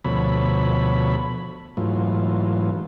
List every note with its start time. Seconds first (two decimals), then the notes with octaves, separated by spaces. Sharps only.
0.04 D2 B2 F3 A4 C#5 B5
1.77 G#2 E3 F#3 A3 F4